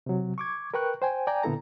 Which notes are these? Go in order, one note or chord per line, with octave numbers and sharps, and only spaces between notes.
C3 F#3
C#6 D6 G#6
A#4 B4 G5 C#6 F#6
C5 G5 G#5
D5 G5 G#5 A#5
A#2 D3 B3 E4 A4 A#5